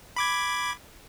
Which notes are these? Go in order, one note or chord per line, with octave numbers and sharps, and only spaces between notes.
B5 D6 G#6